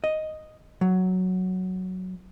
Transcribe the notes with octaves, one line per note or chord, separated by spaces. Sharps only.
D#5
F#3